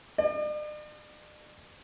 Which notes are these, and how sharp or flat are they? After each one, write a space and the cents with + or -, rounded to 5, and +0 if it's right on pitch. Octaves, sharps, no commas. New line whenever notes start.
D5 +45